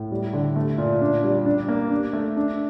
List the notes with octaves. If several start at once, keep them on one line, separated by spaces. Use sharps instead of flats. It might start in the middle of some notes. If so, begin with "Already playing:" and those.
Already playing: A2
G3
D3
A3
A#2
D4
G3
D4
A#3
D4
A3
D4